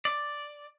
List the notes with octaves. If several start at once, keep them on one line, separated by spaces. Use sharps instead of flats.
D5